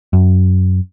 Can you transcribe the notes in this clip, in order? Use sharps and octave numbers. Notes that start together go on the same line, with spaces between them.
F#2